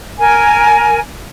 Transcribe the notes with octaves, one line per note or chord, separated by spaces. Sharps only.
A#4 G#5